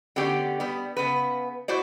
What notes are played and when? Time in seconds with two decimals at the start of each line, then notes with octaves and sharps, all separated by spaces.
0.16 D3 B3 C#4 G4 D5
0.60 G3 B3
0.97 C#3 B3 B4
1.68 E4 F#4 C5 D5